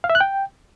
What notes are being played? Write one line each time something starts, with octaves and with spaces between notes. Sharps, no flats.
F5
E5
F#6
G5